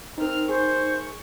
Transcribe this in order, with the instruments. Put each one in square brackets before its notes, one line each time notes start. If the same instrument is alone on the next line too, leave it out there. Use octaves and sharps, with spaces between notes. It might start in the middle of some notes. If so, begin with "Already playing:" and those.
[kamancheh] C4 F6 [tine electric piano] D#4 A#4
[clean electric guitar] G#4 [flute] C5 [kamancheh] C#6